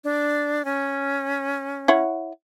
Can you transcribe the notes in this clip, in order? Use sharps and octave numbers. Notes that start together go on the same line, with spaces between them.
D4
C#4
E4 C#5 F#5